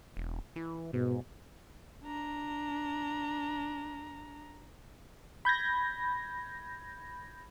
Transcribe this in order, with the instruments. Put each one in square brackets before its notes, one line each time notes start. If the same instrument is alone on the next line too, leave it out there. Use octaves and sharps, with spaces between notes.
[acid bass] E1
E3
[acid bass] G#2 [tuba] B2
[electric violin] D4 A#5
[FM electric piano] B5 G6 G#6 A#6